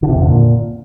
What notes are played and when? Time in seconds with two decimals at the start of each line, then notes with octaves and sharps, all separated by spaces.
0.03 D3
0.09 C3
0.16 F2
0.22 D3
0.28 A#2